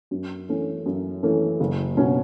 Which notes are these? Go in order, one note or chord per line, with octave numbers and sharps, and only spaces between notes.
F#2
E3 A3 C#4
F#2
E3 A3 C#4
F#1
B2 F#3 C#4